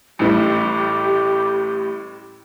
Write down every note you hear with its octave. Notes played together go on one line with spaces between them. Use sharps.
A1 A2 G3 G4